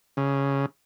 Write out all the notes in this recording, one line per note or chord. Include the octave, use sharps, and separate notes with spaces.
C#3